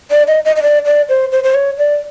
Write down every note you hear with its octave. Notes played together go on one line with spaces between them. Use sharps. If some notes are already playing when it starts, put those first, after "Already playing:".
D5
D#5
D#5
D#5
D5
D5
C5
C5
C5
C#5
D5